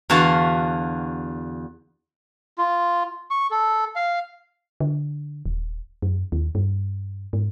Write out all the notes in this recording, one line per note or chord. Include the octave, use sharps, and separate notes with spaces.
E2 D3 F#4 E5 F5 A5
F4
C#6
A4
F5
D3
D#1
F#2
D#2
G2
G#2